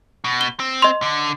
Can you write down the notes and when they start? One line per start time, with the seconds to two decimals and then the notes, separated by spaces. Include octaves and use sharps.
0.24 B2
0.41 G7
0.60 C4
0.82 D#5 C6
1.02 D3